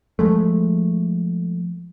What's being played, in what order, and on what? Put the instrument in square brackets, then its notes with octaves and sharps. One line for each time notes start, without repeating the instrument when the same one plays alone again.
[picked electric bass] F3 G#3 A3